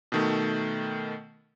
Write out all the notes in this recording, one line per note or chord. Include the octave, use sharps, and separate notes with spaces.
B2 D#3 A3